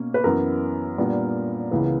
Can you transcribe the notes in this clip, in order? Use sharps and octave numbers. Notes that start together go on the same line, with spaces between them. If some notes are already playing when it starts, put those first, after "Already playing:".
Already playing: B2 A#3 C#4
B4
F#2 E3 B3 E4 A#4
A#2 G3 B3 D4
C#2 C#3 E3 B3